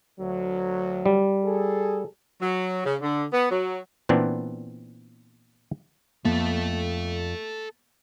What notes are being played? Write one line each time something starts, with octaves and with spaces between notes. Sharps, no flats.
D2 F#3
G3
G#4 A4
F#3
C#3
D3
B3
F#3
A#2 E3 B3 C4 D4
F2 A#3 B3 A4 E5